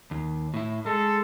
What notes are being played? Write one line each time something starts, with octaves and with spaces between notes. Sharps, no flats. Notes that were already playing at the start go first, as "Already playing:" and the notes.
D#2
A2 E4
G#3 A4